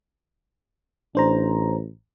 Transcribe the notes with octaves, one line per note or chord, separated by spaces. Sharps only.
A1 D4 C5 A#5